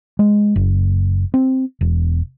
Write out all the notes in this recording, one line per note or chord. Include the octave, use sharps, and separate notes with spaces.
G#3
F#1
C4
E1